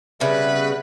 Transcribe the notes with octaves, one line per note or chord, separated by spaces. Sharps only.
C#3 G3 B3 B4 E5